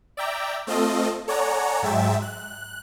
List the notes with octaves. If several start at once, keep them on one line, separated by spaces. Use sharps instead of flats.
D5 E5 G5 A#5
A3 C4 F4 A4 D#5
A4 C#5 D5 F#5 G#5 A#5
G#2 F#3 G#3 E5 G5 A6
F#6